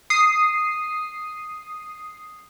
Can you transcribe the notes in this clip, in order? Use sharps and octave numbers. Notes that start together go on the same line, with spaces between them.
D#6 C7